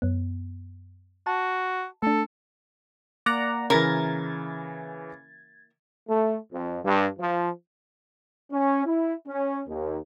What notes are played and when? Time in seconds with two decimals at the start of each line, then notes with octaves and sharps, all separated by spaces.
0.02 F#2 B3
1.27 F#4 A5
2.03 A3 D4 A4
3.26 A#3 D5 F#5 A#5
3.70 C#3 E3 A#3 E4 A#4 G#6 A6
6.08 A3
6.51 F2
6.84 G2
7.19 F3
8.52 C#4
8.85 E4
9.27 C#4
9.68 D#2